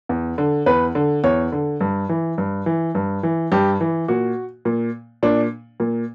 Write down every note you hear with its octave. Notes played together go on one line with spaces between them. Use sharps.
E2
D3
E2 B4
D3
E2 C#5
D3
G2
E3
G2
E3
G2
E3
G2 G4
E3
A#2 F#4
A#2
A#2 D4
A#2